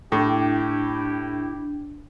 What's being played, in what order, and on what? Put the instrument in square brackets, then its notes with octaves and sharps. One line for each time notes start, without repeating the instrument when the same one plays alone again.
[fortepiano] A2 [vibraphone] D4 [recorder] E4 [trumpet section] G4